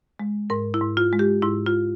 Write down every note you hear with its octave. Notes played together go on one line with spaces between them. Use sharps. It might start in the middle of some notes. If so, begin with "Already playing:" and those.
G#3
G#2 A#4
E4
G#2
F4
G#3
G4
G#2 E4
F4